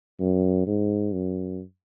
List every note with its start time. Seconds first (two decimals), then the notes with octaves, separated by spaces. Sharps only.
0.20 F#2
0.67 G#2
1.13 F#2